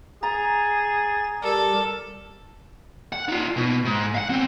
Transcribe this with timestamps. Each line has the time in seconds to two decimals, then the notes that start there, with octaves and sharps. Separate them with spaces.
0.23 G#4 A#5 A6
1.43 G3 G4 A4 A#4
3.13 F#5
3.28 D#4 F4
3.57 B2
3.85 G#2
4.15 F5 F#5
4.30 C4 C#4